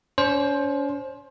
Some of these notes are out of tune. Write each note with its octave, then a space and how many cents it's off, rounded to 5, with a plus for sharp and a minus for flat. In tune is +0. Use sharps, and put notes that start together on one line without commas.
C#4 +40 C5 +15